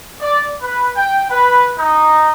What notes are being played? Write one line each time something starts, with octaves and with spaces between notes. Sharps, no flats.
D5
B4
G5
B4
D#4